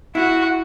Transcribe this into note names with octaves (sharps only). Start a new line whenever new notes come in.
E4 F#4